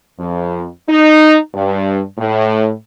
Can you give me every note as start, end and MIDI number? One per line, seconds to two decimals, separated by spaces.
0.19 0.64 41
0.89 1.37 63
1.55 2.00 43
2.18 2.72 45